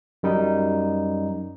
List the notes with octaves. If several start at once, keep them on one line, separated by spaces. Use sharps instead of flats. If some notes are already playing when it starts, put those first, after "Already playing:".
F#2 G3 D#4